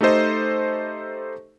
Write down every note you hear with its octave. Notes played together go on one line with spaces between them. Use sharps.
A3 D#4 G4 A4 C5 D#5